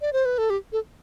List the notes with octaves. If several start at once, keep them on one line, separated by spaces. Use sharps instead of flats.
D5
C5
B4
A4
G4
A4